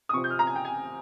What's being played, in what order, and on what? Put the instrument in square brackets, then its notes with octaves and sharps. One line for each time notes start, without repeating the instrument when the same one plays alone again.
[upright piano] D#6
C3 F3 C4 C#6
G6
F6
A#5
G#5
G5
G#5